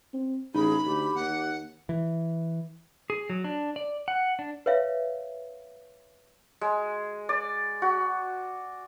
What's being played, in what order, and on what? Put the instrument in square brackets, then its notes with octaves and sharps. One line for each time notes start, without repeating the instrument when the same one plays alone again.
[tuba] C4
[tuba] A1 [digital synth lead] D#4 [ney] G#4 [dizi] B5
[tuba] D2 [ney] G4
[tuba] D#2 [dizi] F#5
[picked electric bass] E3
[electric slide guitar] G#4
F#3
D4
D5
F#5
D4
[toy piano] B4 C#5 E5 F5
[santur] G#3
D5
F#4